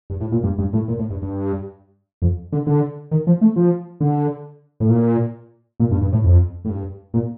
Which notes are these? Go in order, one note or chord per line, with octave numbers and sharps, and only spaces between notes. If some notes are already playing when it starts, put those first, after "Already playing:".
G2
A2
A#2
G2
G2
A2
A#2
A2
G2
G2
F2
D3
D3
D#3
F3
A3
F3
D3
A2
A#2
A#2
G2
G2
A2
F2
A2
G2
A#2